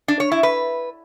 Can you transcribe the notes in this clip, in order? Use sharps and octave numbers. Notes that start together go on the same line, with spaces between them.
D4
C#5
E4
B4